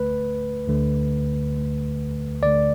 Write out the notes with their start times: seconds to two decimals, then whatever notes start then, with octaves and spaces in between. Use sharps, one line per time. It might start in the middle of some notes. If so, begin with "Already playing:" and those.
Already playing: D2 D3 A3 B4
0.67 D2 D3 A3
1.55 D2 D3 A3
2.42 D2 D3 A3 D5